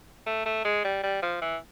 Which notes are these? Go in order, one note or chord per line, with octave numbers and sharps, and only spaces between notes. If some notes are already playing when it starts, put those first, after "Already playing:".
A3
A3
G#3
G3
G3
F3
E3